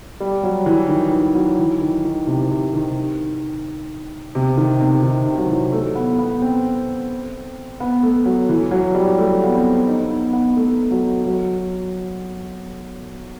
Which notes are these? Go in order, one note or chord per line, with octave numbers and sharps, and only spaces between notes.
G3
F#3
E3
D#3
E3
F#3
E3
D#3
D#3
C3
C3
D#3
C3
D#3
C3
D#3
C3
F#3
E3
A3
B3
B3
C4
B3
A3
F#3
E3
F#3
G3
A3
B3
C4
D#4
B3
B3
A3
F#3
F#3